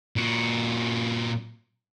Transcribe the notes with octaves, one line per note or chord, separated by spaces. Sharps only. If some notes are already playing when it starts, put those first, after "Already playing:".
A#2 F#4